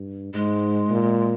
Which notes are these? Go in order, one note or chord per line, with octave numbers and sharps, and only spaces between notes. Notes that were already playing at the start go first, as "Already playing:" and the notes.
Already playing: G2
G#2 G#3
A#2